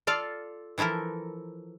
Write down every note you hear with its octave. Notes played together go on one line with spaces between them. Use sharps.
F4 A4 D5 F5
E3 F3 E4 A4 A#4